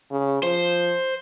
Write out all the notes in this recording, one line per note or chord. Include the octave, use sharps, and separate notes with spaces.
C#3
F3 C5